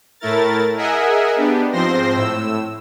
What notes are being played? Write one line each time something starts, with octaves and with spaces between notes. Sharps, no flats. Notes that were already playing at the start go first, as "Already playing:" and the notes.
A2 A3 E4 A#4 A6
G#4 A#4 D#5 E5 F#5 G#5
B3 D4 G4
G#2 F3 C4 C5 C6 A#6
A2 E6